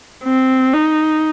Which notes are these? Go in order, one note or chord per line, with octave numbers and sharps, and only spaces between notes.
C4
D#4